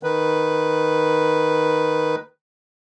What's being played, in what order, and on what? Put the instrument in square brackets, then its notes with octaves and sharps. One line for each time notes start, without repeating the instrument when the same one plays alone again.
[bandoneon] D#3 B4